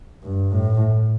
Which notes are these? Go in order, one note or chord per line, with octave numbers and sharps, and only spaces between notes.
G2
A2